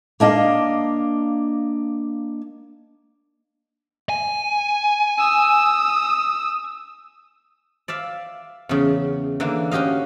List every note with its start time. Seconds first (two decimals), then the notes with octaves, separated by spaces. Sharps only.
0.20 A#3 D4 D#5 F5
4.09 G#5
5.19 D#6 E6
7.88 D5 E5 F5
8.69 E2 C#3
9.40 D3 E3 A#3
9.71 C#4 F#4 G4 D#5 F5